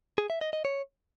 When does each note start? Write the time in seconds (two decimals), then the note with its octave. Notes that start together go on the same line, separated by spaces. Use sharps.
0.18 G#4
0.30 E5
0.41 D#5
0.53 D#5
0.65 C#5